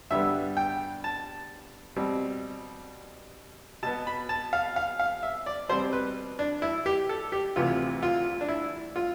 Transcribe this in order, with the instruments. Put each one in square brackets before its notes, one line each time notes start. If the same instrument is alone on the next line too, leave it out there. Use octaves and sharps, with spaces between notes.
[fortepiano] G2 D3 G3 B3 E5
G5
A5
B2 G3 C4
B2 A5
B3
B5
A5
F5
F5
F5
E5
D5
B2 G3 C4 C5
B4
D4
E4
G4
A4
G4
D2 C3 E3 F4
F4
D4
E4
F4